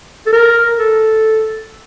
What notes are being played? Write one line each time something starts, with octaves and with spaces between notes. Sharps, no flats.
A4
A#4
A4